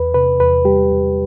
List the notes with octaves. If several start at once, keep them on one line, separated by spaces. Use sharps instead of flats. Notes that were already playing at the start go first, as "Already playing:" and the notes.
Already playing: E2 B4
C3 B4
E2 B4
G3 G4
E2